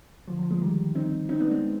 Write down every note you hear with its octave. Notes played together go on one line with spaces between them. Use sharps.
D3 F3
D3 F3
F3 G#3
D#3 G3
C4 D#4
C4 D#4
B3 D4
G#3 C4